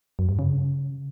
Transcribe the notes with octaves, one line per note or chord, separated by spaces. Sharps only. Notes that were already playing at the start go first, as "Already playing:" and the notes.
F#2
G2
C#3